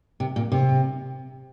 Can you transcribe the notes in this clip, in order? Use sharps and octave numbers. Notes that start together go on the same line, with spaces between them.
C3
A#2
C3